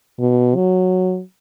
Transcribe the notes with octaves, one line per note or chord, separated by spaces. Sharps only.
B2
F#3